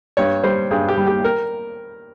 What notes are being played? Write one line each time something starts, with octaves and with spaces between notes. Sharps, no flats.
G2 C#5
G3 C5
G2 G#4
G4
G3
G4
A#4